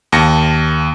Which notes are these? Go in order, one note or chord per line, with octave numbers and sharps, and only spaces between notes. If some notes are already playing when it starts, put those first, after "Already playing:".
D#2 A5 A#6 C#7